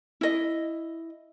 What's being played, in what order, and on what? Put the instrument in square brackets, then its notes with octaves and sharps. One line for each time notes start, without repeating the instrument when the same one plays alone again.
[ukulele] E4 D#5